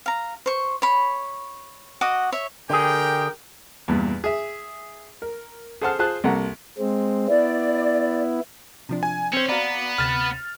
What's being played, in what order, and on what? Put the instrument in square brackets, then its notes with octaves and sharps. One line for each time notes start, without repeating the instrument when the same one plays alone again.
[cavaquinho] F5 A#5
C5 C#6
C#5 B5
F#4 D#5 F#5 D6
C#5 E5
[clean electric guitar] D3 G#4 [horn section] G4 A#4 G5
[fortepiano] E2 G2 A#2
G#4 E5
A#4
G#4 A4 C5 F#5 A5 F6
F4 G#4 C5 A5 F#6
C2 C3 A#3 A4 F#5 A#5
[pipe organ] G#3 C4
[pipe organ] B3 E4 [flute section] D5
[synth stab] C3 F3 D4
[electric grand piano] G#5
[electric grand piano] C4 C5 [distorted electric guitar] C#4
[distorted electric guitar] B3 [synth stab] F#4 F5 A#5 [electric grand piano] D5
[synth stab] D2 C3 E7 [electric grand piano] F6 A6